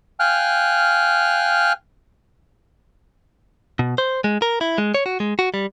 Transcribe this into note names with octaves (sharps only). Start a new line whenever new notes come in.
F5 G5 G#5 F6 F#6
B2
C5
G#3
A#4
E4
G#3
C#5
F#4
G#3
F#4
G3